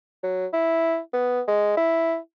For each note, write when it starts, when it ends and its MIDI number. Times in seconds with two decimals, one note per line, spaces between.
0.23 0.46 54
0.53 0.99 64
1.13 1.41 59
1.48 1.74 56
1.77 2.17 64